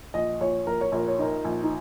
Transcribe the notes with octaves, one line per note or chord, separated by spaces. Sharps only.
A#1 D#5
A#1 C#5
A#1 A#4
C#5
A#1 A#4
C#5
D#4 A#4
A#1
D#4